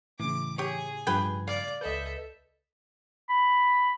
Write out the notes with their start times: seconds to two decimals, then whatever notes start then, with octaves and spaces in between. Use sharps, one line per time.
0.20 A2 C#3 E3 D6
0.58 G4 G#4 C#5
1.07 G2 F3 G4 B4 G5 G#6
1.48 D5 F5
1.81 C#2 A4 B4 D#5 E5 G6
3.29 B5